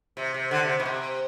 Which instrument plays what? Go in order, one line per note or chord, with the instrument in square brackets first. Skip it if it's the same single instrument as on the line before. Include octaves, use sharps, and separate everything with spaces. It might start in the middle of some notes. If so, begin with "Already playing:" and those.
[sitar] C3
C3
D3
C3
B2
C3